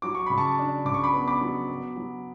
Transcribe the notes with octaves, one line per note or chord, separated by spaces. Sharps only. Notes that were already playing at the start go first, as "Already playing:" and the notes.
F#3 D6
C#6
C#3 B5
A5 C#6
D4
C#3 D6
C#6
B5 D6
B3
B5 D6
F#3
B3
F#3